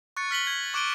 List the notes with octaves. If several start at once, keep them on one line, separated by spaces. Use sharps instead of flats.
C#6 F#6 A6 C#7
F6 B6 F#7 G7
G#6
C#6 D6 F#6 D7 D#7 G7